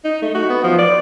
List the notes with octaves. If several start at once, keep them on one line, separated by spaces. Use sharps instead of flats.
D#4
A3
F#4
B3
F3
D5